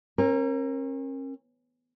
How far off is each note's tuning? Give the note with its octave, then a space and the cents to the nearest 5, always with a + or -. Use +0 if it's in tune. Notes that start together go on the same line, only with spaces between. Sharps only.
C#4 -45 A#4 +5